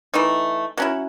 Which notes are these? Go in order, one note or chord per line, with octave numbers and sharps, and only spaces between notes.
E3 A3 D#4
F#3 C#4 E4 F#5